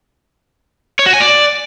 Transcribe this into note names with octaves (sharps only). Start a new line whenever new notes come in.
C#5
F#4
G#5
D5